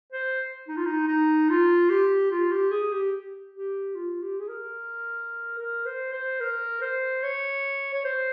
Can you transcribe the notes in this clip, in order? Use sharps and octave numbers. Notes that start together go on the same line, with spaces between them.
C5
D#4
F4
D#4
D#4
F4
G4
F4
G4
G#4
G4
G4
F4
G4
G#4
A#4
A#4
C5
C5
A#4
C5
C#5
C#5
C5